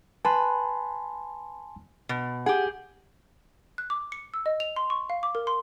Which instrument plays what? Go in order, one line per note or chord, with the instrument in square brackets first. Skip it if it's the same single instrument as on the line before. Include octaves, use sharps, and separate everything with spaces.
[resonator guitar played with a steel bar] B4 [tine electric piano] G#5 A5 C6
[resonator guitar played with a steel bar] B2
[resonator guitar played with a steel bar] G4 G#4 [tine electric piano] F#5
[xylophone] F#6
D6
C#7
E6
D#5
F7
C6
C#6
F5
D6
A#4
C6